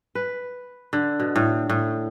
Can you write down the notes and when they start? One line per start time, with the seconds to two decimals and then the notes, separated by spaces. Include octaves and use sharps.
0.15 B4
0.93 D3
1.20 B2
1.36 A2
1.70 A2